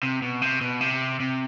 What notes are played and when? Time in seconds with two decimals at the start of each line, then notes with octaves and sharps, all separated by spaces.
0.03 C3
0.22 B2
0.42 C3
0.61 B2
0.81 C3
1.20 C3